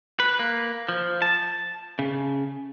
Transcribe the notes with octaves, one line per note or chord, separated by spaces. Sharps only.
B4
A#3
F3
A5
C#3